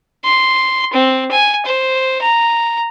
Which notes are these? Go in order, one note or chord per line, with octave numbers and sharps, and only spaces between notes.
C6
C4
G#5
C5
A#5